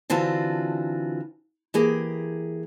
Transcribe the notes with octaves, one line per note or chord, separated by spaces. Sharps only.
D3 E3 C4 F4 F#4 A5
E3 A#3 G4 G#4